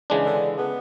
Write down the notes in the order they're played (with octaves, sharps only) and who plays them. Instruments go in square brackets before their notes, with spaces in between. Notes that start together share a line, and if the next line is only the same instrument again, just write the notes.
[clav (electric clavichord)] C#3 E3 G#3 D4
[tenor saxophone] D3
B3